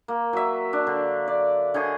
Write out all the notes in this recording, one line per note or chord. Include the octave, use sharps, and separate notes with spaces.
A#3
F#3 E5
D4
D3
D5
D3 G#4 C#5 D#5